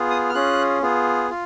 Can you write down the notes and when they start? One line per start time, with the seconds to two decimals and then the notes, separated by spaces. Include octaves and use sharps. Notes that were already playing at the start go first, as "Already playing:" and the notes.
Already playing: B3 F4 G#4
0.10 D#6
0.29 F6
0.34 C#4 F4 G#4 F#6
0.82 B3 F4 G#4
1.30 F4